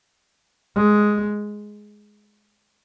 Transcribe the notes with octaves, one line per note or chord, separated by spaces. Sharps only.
G#3